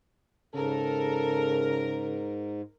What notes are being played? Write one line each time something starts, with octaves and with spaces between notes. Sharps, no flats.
G#2 C#3 A4 A#4